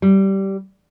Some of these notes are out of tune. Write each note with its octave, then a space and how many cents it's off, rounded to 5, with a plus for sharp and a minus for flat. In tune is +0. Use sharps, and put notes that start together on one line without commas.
G3 -15